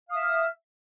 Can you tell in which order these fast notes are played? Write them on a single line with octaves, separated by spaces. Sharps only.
F5 D#6 E5 F6